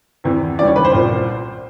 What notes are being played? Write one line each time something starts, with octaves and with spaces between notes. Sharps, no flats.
E2 C3 E3
D#2 C#3 E3 G3 D5
C#5
B4
C5
C2 A#2 G3